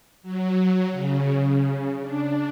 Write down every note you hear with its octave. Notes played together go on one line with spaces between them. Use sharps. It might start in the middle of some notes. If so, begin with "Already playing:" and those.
F#3
C#3
D4